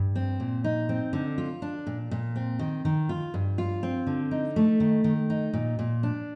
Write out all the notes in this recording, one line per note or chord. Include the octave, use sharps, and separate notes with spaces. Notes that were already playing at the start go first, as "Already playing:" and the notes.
Already playing: G2
C4
A#2
D#4
C4
D3
F4
D4
A#2
A#2
C4
D#3
D#3
F4
G2
F4
C4
D3
D#4
A3
D#3
D#3
D#4
A#2
A#2
D4